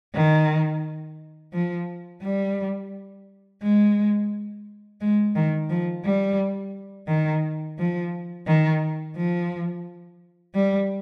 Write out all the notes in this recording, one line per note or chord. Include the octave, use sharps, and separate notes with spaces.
D#3
F3
G3
G#3
G#3
D#3
F3
G3
D#3
F3
D#3
F3
G3